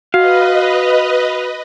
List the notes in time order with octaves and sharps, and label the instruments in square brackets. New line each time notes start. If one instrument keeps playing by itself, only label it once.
[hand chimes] F#4 [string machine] B4 D#5 [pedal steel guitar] F5